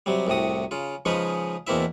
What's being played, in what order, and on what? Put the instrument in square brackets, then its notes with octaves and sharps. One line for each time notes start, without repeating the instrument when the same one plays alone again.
[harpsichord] C3 F#3 G3
C2 A2 C3 F#4 D#6
C#3 F4
C#3 F3 G#3 C#4 D#4 B4
E2 B2 A#3 C4 E4 E5